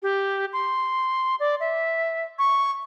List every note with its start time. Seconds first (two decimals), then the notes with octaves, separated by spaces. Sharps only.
0.03 G4
0.53 C6
1.40 D5
1.60 E5
2.39 C#6